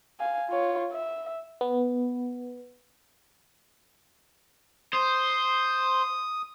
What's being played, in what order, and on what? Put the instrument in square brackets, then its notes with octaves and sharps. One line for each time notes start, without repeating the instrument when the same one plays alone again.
[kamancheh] F5 G#5
F4 C#5
E5
[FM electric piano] B3
[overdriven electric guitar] C5 [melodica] D#6